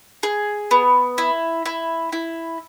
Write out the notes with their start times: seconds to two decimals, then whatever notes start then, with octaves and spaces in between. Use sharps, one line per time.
0.23 G#4
0.71 B3
1.18 E4
1.66 E4
2.12 E4